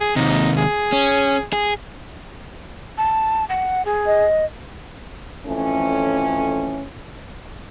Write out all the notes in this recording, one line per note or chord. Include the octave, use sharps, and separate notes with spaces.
G#4
D#2 C3 D#4
G#4
C#4
G#4
A5
F#5
G#4
D#5
F2 E3 A3 C#4